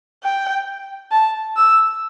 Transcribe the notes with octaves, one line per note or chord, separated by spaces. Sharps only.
G5
A5
E6